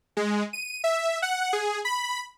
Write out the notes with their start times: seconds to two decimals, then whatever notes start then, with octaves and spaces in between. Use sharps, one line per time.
0.17 G#3
0.53 D#7
0.84 E5
1.22 F#5
1.53 G#4
1.85 B5